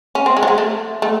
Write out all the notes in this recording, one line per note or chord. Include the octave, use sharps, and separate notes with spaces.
C#4
C4
G#3
F#3
G#3
A3
A3